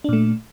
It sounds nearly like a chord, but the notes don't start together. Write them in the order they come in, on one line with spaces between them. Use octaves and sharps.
D4 A#2 A3